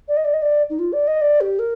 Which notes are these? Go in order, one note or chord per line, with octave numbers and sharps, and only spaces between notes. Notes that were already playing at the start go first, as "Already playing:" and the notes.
D5
D#5
D5
D#5
D5
D#4
F4
D5
D#5
D5
G4
A#4